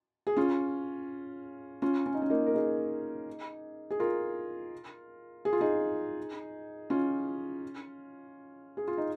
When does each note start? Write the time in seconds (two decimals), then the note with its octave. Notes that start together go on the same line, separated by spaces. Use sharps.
0.27 G#4
0.37 C#4 F4
1.82 C#4 F4
2.06 C#4
2.14 D#4
2.22 C#4
2.30 A#3 D#4
2.46 A#4
2.54 D#4 G#4
3.91 G#4
3.99 F4 A#4
5.45 G#4
5.53 F4
5.61 D#4 G#4
6.90 C#4 F4
8.77 G#4
8.88 F4
8.98 D#4